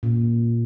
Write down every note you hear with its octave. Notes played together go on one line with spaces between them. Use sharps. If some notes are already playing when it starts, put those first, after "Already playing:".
A#2